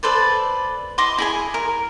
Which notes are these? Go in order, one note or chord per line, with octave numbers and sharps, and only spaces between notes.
A4 B4 C5 D5
E4 D#5 C6 D6
E4 G#4 G#5
A#4